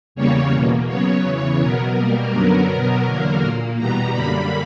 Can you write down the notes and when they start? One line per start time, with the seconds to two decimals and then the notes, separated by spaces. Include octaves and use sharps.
0.15 E2 C#3 G3 A#3 C#5
0.52 E2 B2 A#3
0.88 C#3 F#3 B3 C#5
1.24 E2 C#3 E3
1.60 B2 F#3 B3 A#4
1.96 B2 G3 A#3
2.32 F#2 D3 F#3 B3 A#4
2.69 B2 F#3 B3
3.05 E2 D3 F#3 A#3
3.41 A#2 A#3
3.77 E2 B2 G3 B3 A#5
4.14 F#2 D3 G3 A#3 B5